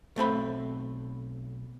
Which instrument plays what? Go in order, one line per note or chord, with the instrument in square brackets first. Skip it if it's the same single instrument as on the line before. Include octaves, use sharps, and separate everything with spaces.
[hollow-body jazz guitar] B1 A3 C4 B5